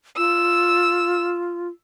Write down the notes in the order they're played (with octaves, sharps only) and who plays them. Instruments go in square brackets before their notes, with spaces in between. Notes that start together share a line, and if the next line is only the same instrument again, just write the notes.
[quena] F4 [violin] E6